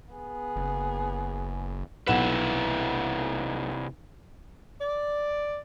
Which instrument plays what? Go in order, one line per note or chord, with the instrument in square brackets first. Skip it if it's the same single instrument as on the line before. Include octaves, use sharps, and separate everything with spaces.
[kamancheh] B3 G#4
[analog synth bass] F#1
[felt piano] B1 F#5 E7 [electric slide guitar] C3 E4 B4
[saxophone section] D5